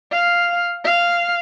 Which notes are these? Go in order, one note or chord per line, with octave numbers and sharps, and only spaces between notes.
F5
F5